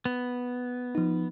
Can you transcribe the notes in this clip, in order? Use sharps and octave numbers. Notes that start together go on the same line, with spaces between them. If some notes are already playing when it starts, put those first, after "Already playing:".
B3
F3 D#4